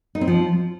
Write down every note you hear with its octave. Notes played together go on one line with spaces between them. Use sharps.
D#4
C4
F3